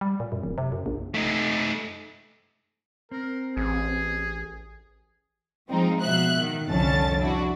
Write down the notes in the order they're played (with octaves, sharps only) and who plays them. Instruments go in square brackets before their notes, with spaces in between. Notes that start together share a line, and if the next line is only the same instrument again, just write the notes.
[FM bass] G3
A#2
F#2
D1
C3
F#2
A#1
[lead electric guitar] A3 D#4
[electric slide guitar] C4 [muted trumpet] A#4
[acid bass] A1 [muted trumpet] G#4
[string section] F3 G#3 C4 D#4
B2 F3 E5 F#6
D#3
C2 F2 D3 C#4 A5 A6
D4 E4 F#4